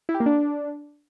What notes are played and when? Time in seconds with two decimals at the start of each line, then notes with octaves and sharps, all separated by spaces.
0.09 E4
0.15 G4
0.20 A#3
0.26 D4